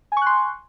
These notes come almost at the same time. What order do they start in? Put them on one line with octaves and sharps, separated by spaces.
G#5 C#6 F#6 C6